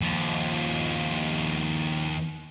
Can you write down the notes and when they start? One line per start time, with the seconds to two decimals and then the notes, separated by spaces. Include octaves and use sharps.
0.01 D#2 F3